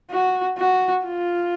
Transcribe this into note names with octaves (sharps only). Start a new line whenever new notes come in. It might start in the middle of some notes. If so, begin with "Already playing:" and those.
F#4
F#4
F4